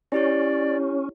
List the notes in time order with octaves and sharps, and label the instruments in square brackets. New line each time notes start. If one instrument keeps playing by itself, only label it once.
[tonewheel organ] C#4 [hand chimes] E4 G4 C#5 [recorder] D5